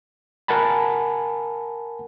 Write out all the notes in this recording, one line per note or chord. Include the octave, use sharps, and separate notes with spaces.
A#4 F#5 G#5 A5 B5